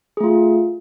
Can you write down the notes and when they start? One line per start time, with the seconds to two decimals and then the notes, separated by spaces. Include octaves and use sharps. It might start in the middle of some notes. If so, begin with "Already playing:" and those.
0.17 G#4
0.20 A3
0.24 F4